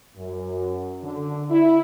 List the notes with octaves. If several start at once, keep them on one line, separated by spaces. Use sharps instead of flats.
F#2
D3
E4